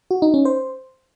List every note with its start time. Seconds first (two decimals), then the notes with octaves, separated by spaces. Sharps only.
0.11 F#4
0.22 D#4
0.34 C#4
0.45 C5